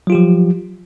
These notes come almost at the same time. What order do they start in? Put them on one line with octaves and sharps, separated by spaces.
F#3 F4 G4 F3